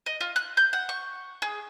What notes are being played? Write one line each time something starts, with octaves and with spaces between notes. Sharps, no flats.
D#5
F4
F#6
G6
F#5
C#6
G#4